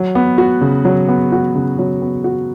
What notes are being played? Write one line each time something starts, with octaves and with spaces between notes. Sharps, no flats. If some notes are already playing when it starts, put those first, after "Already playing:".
Already playing: F#3
B3
F#4
C#3
F#3
B3
F#4
C#3
F#3
B3
F#4